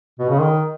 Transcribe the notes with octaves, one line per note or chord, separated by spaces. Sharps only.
B2
C#3
D#3